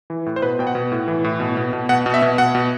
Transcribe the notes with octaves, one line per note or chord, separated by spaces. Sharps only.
E3
A2
C5
B2 B4
B2 G5
F#5
B2
A2
E3
A2
B2
B2
B2
B2 F#5
B2
E5
B2
B2 F#5
B2